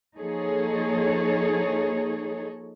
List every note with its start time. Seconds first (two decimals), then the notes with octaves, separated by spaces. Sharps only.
0.17 F3 A#3 D#4 G#4 A4 C#5